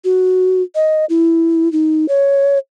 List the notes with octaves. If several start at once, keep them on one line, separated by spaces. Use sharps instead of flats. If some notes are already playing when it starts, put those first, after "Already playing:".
F#4
D#5
E4
D#4
C#5